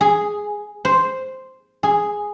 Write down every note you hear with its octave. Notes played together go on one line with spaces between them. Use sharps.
G#4
C5
G#4